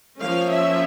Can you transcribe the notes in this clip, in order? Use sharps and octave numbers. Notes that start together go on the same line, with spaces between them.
F3 A#3 C#4 F5
E5